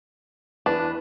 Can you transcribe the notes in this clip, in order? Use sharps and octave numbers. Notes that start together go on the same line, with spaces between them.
E2 D4 B4